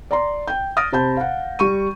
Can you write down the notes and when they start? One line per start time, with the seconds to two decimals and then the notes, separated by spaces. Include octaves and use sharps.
0.11 D5 A#5 C6
0.48 G5 G6
0.77 D#6 F6 A6 A#6 D7
0.92 C3 C5 A5 B5 G6
1.17 F5 F#5
1.59 G3 C#6 D#7